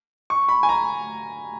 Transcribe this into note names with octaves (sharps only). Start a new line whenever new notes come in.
C#6
B5
G#5
A#5